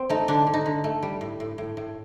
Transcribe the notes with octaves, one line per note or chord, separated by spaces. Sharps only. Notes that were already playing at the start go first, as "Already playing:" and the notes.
Already playing: C4
A3 D#4
D3 D4
D3
D#4
D3
A3
G3
A2
A2
A2
A2